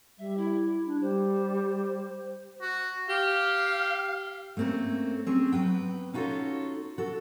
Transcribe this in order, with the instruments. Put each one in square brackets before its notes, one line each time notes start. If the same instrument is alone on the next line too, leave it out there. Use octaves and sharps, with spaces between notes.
[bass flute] G3 [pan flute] E5
[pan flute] E4
[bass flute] D4
[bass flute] G3 [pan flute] C5
[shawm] F#4
[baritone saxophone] G4 [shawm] F5
[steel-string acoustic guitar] A3 A#3 C4 C#4 A#4
C4 C#4 G#4
F#3 B3 B4 G5
C#4 D#4 F4 F#4 A4 C#5
F#4 A4